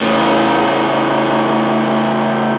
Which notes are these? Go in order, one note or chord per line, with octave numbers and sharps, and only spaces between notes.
A2 C#3